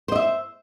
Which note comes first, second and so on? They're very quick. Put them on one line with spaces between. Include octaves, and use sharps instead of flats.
C5 D#5 E5